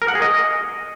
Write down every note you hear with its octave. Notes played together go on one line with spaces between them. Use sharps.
A#4
F#5
G#4
D#5